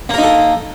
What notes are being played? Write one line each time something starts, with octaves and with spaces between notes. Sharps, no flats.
A#3 D#4 A4 A#4